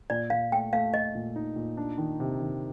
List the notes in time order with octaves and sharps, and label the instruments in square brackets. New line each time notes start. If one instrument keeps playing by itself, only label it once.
[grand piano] A#2 [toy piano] D5
[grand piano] A#2 [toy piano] F5
[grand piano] A3 [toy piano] G5
[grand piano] A3 [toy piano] F5
[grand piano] A3 [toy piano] D#5
[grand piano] A#2
D#4
A#2
D4
D#3
C3
D#3